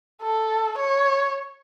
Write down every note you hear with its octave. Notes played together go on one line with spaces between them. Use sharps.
A4
C#5